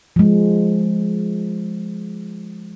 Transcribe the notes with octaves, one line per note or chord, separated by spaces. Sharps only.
F3 G#3